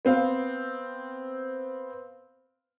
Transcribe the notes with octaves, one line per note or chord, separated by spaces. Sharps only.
B3 C4 F5